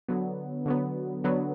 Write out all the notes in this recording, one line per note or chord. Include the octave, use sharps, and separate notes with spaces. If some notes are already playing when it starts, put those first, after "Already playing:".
D3 F#3 B3
D3 F#3 B3
D3 F#3 B3